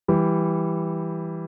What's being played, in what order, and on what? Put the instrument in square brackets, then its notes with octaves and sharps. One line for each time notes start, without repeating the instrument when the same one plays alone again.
[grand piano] E3 G3